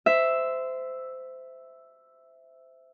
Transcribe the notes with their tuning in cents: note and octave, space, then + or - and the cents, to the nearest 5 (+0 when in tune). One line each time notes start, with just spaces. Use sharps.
C5 -20 E5 +0